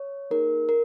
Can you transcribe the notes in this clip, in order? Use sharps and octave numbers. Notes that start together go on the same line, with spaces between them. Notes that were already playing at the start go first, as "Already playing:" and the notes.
Already playing: C#5
A#3 D#4 G#4 A#4
A#4